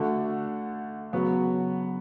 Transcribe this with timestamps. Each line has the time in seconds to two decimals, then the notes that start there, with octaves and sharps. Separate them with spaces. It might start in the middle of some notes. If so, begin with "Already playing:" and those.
Already playing: D3 A3 D4 F#4
1.13 C#3 F#3 B3 F#4